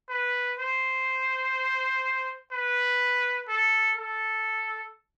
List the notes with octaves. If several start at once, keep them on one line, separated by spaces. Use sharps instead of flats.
B4
C5
B4
A4
A4